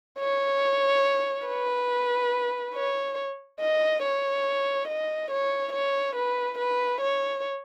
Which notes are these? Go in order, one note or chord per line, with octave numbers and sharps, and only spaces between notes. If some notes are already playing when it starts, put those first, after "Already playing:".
C#5
B4
C#5
D#5
C#5
D#5
C#5
C#5
B4
B4
C#5